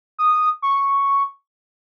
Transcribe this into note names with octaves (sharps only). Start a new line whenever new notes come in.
D#6
C#6